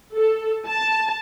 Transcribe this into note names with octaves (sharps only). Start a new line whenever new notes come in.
A4
A5